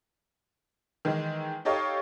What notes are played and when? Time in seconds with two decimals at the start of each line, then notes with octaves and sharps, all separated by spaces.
1.05 D#3 E3 G#3
1.65 D#4 G4 A4 C#5 D#5 F5